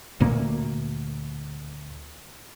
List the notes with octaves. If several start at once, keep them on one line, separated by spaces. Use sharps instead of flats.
D2 A#2 A#3